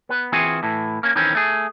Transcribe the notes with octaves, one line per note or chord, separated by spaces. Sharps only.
B3 B4
E3 C4 F4 F#4 G#4 G#5
A2 E3
A#3 C#4
D#3 E3 C4 C#4
A3 G#4